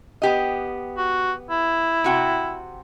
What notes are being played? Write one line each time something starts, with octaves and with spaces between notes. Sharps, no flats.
B3 G4 D#5
F#4
E4
C3 F#4 G5